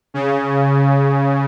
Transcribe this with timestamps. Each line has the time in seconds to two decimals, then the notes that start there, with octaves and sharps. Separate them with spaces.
0.14 C#3